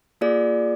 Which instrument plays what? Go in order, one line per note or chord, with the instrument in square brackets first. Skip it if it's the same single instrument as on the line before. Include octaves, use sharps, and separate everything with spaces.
[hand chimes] A#3 F4 G#4 D5